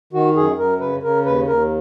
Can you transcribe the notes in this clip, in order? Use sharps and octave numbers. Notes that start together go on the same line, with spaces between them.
D#3 F#4
F#2 G#4
F#2 A#4
C#3 B4
C#3 A#4
D#2 B4
D#2 A#4